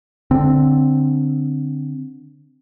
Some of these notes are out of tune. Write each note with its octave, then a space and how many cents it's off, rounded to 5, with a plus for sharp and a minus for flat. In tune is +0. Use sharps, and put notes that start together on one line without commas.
D3 +0 C4 +0